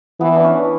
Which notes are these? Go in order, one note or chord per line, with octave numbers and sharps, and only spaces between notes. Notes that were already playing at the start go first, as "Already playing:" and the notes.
E3 B3
D4
C#4